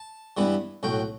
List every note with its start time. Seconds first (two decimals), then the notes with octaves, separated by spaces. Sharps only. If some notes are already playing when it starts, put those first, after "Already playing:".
Already playing: A5
0.37 G2 E3 G3 B3 E4
0.83 B1 A2 F#3 G5